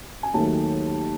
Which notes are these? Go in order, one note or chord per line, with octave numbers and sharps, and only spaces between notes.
G#5
D#2 D#3 F#3 A3 A5